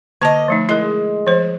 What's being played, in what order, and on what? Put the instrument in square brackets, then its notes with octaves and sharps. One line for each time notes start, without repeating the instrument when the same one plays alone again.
[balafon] D3 A5 [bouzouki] A#3 D#5
[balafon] F3 A3 D#4
[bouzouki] G#3 [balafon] E4 A#4
[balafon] F3 C5